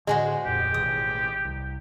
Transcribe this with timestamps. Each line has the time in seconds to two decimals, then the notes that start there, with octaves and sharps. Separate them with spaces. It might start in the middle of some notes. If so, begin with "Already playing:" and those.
0.07 A2 D3 G#3 F#4 G#4 C5
0.45 D1 F2 A#2 G4
0.74 A1 B2 D#3 D#6
1.45 C2